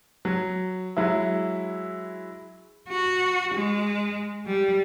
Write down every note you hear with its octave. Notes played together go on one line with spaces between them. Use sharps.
F#3
F#3 G#3 E4
F#4
G#3
G3